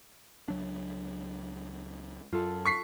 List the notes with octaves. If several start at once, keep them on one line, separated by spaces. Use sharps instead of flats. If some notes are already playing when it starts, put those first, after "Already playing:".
C#2 F#3 D4
F#2 F4 A4
C#6 B6 C7